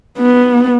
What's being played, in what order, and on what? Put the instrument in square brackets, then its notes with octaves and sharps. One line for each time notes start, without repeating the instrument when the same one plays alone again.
[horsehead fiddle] B3